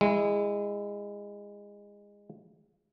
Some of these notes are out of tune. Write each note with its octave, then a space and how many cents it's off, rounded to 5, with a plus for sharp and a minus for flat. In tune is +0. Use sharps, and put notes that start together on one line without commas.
G#3 -25 E4 +0